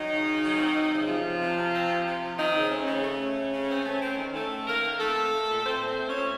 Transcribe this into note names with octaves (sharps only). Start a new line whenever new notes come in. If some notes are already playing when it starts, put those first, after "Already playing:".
Already playing: D#3 F#3 D#4
C#3
C#3
F#3
C4
C4
C#3
D#4
C3 F3 F4
C3
C3
C3
C4
C3
C3
F3
D#3 C4 D#4
C#3
A3 C#4
C#3
A3
A3
C#3
C#3
C4
A3
C4
D#3
D#3 A3 A4
D#3
D#3 A#3 A#4
D#3
A#4
A3 C4 A4
A3
A3
A#2
A#2 C4 C5
A3
C4 C5
A3
C#4 C#5
A#2